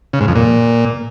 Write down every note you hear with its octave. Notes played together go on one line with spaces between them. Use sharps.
C#3
G#2
F2
A#2